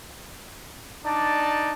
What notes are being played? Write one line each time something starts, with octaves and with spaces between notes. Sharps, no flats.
D4 D#4 D5 A5